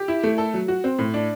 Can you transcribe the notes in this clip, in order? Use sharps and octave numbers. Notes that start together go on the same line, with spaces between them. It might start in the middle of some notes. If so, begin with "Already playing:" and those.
Already playing: G4
E4
A3
A4
F#3
F#4
C4
A2
D4